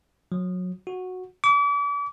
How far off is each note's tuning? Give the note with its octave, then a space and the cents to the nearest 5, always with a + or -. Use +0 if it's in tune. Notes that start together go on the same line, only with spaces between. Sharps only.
F#3 -25
F#4 -10
D6 -40